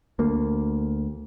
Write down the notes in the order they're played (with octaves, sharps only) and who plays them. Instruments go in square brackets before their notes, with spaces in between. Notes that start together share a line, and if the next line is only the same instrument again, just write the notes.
[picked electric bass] D2 A#3